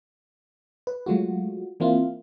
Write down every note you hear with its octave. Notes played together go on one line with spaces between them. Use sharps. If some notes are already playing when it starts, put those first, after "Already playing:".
B4
F#3 G#3 A3 F4 F#4
E3 A#3 C4 E4 F4